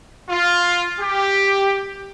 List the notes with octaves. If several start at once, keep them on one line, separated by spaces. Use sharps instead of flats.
F4
G4